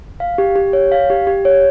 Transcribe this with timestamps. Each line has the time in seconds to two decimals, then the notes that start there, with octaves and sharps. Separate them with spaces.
0.20 F5
0.38 G4
0.56 G4
0.73 C#5
0.92 F5
1.10 G4
1.27 G4
1.45 C#5